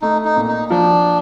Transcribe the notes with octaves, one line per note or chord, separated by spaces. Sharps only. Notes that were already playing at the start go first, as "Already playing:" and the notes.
A3 D#4
D#4
A#2
D#4
F3 D4